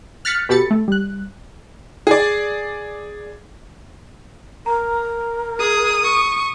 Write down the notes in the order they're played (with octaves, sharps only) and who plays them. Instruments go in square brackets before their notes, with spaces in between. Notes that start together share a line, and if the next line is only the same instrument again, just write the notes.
[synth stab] F6 F#6 A6 B6 C#7
B2 G4 A4 B5 A6 C#7
A3
G3 F#6
[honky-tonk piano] G#4 D5
[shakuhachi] A#4 [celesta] A#5
[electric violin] G#4 [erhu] D#6
[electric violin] C#6